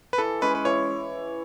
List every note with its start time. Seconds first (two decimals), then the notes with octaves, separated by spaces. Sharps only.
0.13 B4
0.18 E3 A4
0.41 G#3 C#4 B4
0.55 B4
0.65 E3 C#5